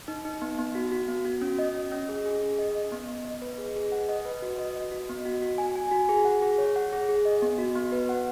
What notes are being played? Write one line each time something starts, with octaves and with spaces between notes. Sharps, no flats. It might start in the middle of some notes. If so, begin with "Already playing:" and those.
D#4
D#4
B3
B3
F#4
F#4
B3
F#4
C#4
D#5
C#4
C#4
G#4
G#4
G#4
D#5
D#5
B3
B3
D#5
B4
G#4
G#4
F#5
D#5
B4
F#4
D#5
D#5
F#4
B3
F#4
F#4
G#5
G#5
F#4
G#4
F#5
G#4
C#5
F#5
G#4
G#4
D#5
B3
F#4
B3
B4
F#5